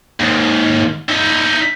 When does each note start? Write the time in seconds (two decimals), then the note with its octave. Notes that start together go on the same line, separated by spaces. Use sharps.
0.20 D#2 G#2
1.09 D#4 E5